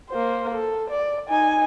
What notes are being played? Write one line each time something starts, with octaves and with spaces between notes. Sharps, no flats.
A#3 C5
A4
D5
D#4 G#5